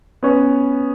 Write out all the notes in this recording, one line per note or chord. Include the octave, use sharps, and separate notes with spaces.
B3 C#4